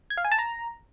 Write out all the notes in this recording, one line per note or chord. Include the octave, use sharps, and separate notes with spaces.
G#6
F5
G#5
A5
A#5